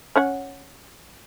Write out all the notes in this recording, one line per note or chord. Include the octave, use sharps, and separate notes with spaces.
C#4 C#5 F#5